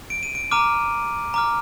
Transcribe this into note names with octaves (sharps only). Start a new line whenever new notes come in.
D7
D#7
D7
A#5 D6 F6 D#7
A#5 D6 F6